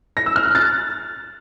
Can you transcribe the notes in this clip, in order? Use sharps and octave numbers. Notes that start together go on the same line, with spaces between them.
A#6
E6
F6
F#6
A6